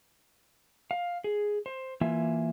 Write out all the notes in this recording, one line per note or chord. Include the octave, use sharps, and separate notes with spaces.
F5
G#4
C5
E3 A#3 F4 E5 G#5